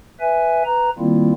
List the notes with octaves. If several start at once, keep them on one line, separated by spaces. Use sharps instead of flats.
B4 E5 G#5
B4 A#5
D#3 G3 A#3 C4 E4 F4